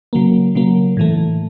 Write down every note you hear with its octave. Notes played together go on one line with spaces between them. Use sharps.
C#3 F#3 A#3
C#3 F#3 A#3
A2 E3 A3